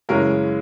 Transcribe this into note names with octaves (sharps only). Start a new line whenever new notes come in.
F#2 C#3 E3 G#3 C#4 A#4